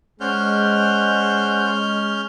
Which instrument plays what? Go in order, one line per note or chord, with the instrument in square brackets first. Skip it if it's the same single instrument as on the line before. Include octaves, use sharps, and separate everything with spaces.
[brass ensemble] G#3 [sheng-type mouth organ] C#4 F6 G6 [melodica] C5 D5 F#5